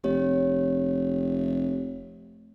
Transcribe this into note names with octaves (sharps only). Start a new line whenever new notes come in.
F1 G4 C#5